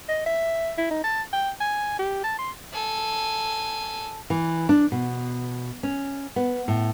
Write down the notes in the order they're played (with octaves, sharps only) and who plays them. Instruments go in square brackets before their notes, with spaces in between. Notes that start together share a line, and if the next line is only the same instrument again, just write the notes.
[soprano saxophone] D#5
E5
E4
D#4
A5
G5
G#5
G4
A5
C6
[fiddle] A4 G#5
[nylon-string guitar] E3
D4
B2
C#4
B3
A2